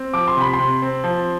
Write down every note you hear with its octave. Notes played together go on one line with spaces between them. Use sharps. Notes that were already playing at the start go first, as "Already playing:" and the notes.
Already playing: C4
F3 D6
C6
C3 B5
C6
C3
C4
F3